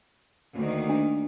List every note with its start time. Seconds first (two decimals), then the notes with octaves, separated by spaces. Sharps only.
0.54 D2 D#3 A#3
0.89 D4